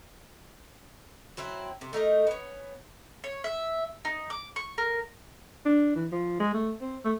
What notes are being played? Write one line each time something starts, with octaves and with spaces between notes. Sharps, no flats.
F#3 C4 E4
C3
A3 D#4 A#4 D#5
B3 C#4
C#5
E5
D#4
D6
C#6
A#4
D4
E3
F3
G#3
A3
C4
A3